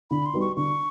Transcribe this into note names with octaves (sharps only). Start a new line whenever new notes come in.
D3 B5
C6
G3 B3 D#4 F#4
C#6
D3 C#6